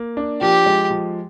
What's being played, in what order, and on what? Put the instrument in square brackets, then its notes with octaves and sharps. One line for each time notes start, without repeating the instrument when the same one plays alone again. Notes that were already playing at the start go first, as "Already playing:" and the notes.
Already playing: [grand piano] A#3
D4
[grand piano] F3 [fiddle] G4
[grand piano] G#3
F3